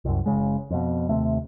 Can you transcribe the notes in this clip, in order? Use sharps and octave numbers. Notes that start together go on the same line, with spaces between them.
C2 F#2
F#1 C2 C#3 G#3
F2 B2
D#2 C3 A3